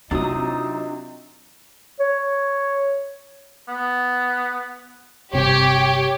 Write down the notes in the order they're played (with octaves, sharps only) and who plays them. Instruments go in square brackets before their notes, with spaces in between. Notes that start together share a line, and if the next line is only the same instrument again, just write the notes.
[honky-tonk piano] C3 F#3 [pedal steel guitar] D4 D#6 [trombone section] D#4 [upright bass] F4
[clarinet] C#5
[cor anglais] B3
[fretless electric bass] G1 C3 [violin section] G4 [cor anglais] C#5